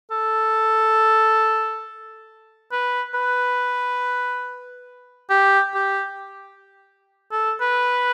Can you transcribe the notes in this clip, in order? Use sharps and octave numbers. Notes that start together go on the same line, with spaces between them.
A4
B4
B4
G4
G4
A4
B4